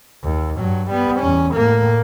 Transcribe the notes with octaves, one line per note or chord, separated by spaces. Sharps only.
D#2
G2 F#3
G3 B3
E2 C#4
A2 A#3